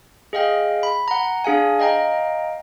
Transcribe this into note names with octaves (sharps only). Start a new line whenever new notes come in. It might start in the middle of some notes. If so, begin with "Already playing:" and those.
G#4 D#5 F5 G5
B5
F#5 A#5
D4 G#4 F5 G#5
D#5 F5 G5 A#5